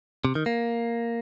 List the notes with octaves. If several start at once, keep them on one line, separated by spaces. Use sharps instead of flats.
C3
D#3
A#3